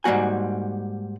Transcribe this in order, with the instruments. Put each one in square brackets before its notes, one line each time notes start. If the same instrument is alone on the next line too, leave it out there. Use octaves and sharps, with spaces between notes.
[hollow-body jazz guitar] G#2 G3 A#3 F#4 G#5